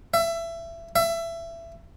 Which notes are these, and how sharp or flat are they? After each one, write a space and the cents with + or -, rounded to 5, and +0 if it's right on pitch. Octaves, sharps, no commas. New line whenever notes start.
E5 +20
E5 +20